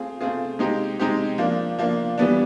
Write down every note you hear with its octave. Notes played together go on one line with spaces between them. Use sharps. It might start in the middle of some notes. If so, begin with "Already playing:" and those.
Already playing: A3 C4 F4 G#4
A3 C4 F4 G#4
G#3 C4 D#4 G4
G#3 C4 D#4 G4
F3 A#3 D4
F3 A#3 D4
E3 G3 B3 D4